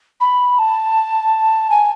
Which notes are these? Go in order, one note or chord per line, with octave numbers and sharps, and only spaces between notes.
B5
A5
G#5